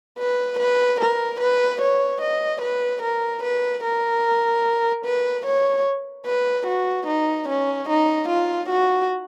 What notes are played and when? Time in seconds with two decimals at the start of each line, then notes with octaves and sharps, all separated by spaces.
0.19 B4
0.59 B4
1.00 A#4
1.40 B4
1.81 C#5
2.21 D#5
2.61 B4
3.02 A#4
3.43 B4
3.84 A#4
5.05 B4
5.46 C#5
6.26 B4
6.66 F#4
7.07 D#4
7.48 C#4
7.89 D#4
8.28 F4
8.69 F#4